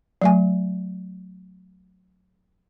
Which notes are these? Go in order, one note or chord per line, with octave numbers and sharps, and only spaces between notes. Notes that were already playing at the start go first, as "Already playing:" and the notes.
F#3 A3 G#5